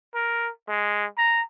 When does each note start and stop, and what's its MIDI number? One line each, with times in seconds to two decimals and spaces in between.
0.15 0.50 70
0.69 1.06 56
1.18 1.42 82